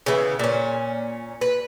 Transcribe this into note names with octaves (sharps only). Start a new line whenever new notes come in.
C#3 E3 B3
A#2 C#4
B4